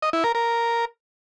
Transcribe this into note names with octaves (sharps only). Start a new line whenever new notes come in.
D#5
E4
A#4
A#4